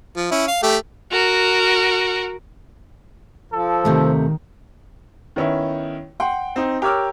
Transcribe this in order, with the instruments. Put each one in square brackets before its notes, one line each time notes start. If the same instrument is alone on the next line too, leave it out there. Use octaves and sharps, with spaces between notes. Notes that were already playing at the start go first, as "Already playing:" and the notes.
[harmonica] F3
C#4 E4
F5
A3 G4
[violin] F#4 A#4
[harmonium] F3 [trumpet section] A4
[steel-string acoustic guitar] D#2 C3 A3 [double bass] D#3
[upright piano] D#3 B3 C#4 E4
F#5 G5 C6
C4 D#4
G4 A#4 C#5 D6 E6 F6